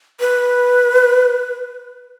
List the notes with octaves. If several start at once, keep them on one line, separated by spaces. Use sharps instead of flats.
B4